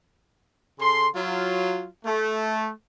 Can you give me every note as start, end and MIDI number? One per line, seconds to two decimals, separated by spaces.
0.79 1.07 49
0.79 1.07 69
0.79 1.07 84
1.15 1.87 54
1.15 1.87 65
2.05 2.70 57